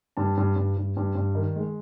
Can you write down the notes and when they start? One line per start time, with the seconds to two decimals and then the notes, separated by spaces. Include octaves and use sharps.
0.17 G2 A5
0.37 G2
0.56 G2
0.77 G2
0.97 G2
1.15 G2
1.35 D#3
1.56 G#3